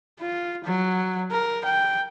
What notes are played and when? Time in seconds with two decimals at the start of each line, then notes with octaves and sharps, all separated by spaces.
0.20 F4
0.64 F#3
1.31 A#4
1.65 G5